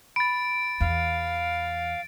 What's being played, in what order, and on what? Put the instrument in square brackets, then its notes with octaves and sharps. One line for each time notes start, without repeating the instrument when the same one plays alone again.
[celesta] B5 [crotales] A6 D7
[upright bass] E2 [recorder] F5